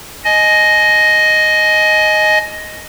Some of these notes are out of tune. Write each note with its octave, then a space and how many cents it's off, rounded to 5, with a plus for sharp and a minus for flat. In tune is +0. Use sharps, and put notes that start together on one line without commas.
D#5 +0 G#5 +30